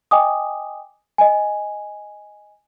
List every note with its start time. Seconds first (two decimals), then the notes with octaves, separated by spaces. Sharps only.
0.11 D#5 G5 G#5 D6 D#6
1.18 D#5 G#5